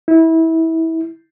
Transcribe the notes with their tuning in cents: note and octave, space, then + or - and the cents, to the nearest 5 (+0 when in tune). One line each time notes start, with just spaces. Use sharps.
E4 -25